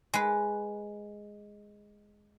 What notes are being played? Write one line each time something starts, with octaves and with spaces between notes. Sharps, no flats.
G#3 B4